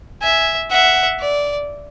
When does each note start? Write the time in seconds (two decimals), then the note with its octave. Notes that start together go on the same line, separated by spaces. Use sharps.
0.21 E5 G#5
0.70 E5 F#5
1.20 D5